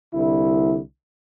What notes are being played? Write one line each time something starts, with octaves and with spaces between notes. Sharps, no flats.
C2 D3 E4